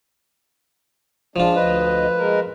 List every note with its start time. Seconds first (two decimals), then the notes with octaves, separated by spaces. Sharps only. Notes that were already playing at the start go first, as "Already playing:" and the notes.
1.36 F3 G#3 D4 F4
1.56 D2 B4 D#5
2.18 G#3 A#4